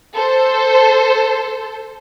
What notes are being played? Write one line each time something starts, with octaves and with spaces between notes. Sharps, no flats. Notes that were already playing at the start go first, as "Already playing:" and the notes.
A4 C5